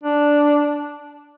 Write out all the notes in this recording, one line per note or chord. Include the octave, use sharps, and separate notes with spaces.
D4